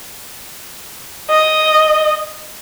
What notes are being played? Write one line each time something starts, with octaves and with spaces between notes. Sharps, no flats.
D#5